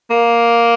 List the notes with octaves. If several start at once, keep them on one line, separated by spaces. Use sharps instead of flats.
A#3